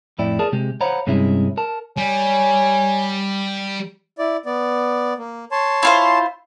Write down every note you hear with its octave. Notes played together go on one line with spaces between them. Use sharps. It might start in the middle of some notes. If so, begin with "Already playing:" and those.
F2 A2 E4 D5 G5
G#4 A#4 D5 A5
C3 G#3 G4
C5 C#5 F5 F#5 A#5 B5
G2 C3 G#3 C#4 E4
A#4 A5
G3 C#5 G#5
E4 D5
B3 D5
A#3
C#5 A5 C6
E4 F4 C5